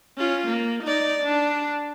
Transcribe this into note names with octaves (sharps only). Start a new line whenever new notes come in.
C#4 F4
A#3
D#4 D5
D4